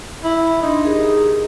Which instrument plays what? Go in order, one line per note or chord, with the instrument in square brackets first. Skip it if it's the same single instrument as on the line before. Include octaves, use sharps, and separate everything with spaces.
[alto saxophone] E4
[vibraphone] D4 C6 [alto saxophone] D#4
[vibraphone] G4 G#4 A#4